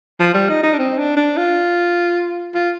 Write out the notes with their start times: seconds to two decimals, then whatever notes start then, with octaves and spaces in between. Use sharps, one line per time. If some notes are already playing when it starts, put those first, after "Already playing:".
0.19 F3
0.34 G3
0.49 D#4
0.63 D#4
0.73 D4
0.79 C4
0.98 D4
1.16 D4
1.37 F4
2.54 F4